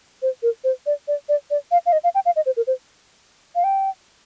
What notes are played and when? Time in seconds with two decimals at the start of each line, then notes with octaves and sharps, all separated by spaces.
0.22 C5
0.43 A#4
0.64 C5
0.86 D5
1.08 D5
1.29 D5
1.51 D5
1.71 F5
1.86 F5
1.93 D#5
2.04 F5
2.15 G5
2.26 F5
2.36 D#5
2.46 C5
2.57 A#4
2.67 C5
3.55 F5
3.64 G5